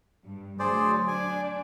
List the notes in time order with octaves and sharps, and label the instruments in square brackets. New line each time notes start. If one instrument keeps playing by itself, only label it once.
[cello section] G2
[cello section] D2 F#3 [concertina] G#4 C5 D5
[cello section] D4 D5 [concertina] G#5